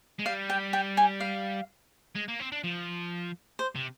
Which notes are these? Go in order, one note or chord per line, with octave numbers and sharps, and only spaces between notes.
G#3
G3 F5
G5
G5
G#5
F5
G#3
A#3
C4
D4
F3
C5
C3